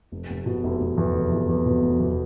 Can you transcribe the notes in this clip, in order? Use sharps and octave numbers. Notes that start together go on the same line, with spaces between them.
F1
F1
B2
F1
F1
E2
F1
E2
E2
B2
F1
E2